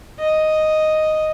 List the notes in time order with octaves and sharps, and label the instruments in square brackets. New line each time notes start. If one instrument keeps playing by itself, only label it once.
[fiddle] D#5